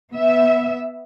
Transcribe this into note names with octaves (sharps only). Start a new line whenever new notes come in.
B3 E5